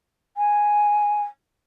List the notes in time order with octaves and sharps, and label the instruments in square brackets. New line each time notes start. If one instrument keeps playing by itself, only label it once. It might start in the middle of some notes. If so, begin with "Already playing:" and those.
[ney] G#5